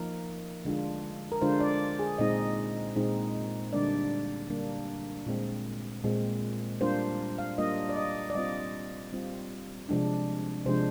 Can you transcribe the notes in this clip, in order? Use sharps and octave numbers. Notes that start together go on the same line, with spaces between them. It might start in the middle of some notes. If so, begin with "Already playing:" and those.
Already playing: F3 A#3 D#4 A#4
D3 G#3 D4 F4
A#4
D3 G#3 D4 F4 C5
D5
G#4
A#2 G#3 C4 D#4 D#5
A#2 G#3 C4 D#4
D3 G3 A#3 D4 D5
D3 G3 A#3 D4
A#2 G#3 C4
A#2 G#3 C4
G3 A#3 D4 F4 C5
F5
G3 A#3 D4 F4 D#5
D5
D#5
D5
G3 C4 F4 D#5
G3 C4 F4
C3 F3 G#3 D4
C3 F3 G#3 D4 C5